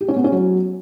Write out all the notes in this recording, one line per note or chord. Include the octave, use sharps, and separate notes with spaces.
G4
C#4
B3
C#4
F#3